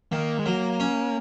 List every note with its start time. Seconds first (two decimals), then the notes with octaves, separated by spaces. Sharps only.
0.12 D#3 A#3
0.39 G#3
0.45 F#3 A#3
0.80 C#4